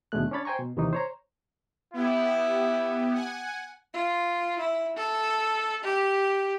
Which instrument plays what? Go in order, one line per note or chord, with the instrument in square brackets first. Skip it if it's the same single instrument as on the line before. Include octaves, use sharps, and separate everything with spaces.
[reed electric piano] D#2 B2 D3 G#3 A3 F#6
C#4 D4 C#5 B5 A6
C5 G5 G#5 A#5 C#6
B2
D#2 C3 D#3 E3 D#4
C5 C#5 A#5
[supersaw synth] B3 G4 [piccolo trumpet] E4
[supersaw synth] F#5 G#5
[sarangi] F4
E4
A4
G4